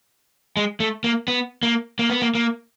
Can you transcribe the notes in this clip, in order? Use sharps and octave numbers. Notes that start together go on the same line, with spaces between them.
G#3
A3
A#3
B3
A#3
A#3
B3
A#3
A#3